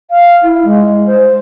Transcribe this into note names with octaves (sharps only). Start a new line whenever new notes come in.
F5
E4
G#3
C5